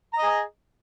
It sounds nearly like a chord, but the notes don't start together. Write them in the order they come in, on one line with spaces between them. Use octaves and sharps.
A#5 D#5 G#4